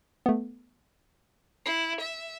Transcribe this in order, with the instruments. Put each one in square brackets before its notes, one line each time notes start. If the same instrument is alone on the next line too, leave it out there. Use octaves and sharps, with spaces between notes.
[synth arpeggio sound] A3 B3
[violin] E4 [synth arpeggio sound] C7
[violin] E5